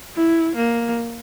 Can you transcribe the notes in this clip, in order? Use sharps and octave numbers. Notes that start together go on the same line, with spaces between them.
E4
A#3